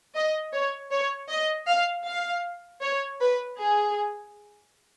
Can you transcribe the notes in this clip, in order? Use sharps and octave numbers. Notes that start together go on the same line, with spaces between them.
D#5
C#5
C#5
D#5
F5
F5
C#5
B4
G#4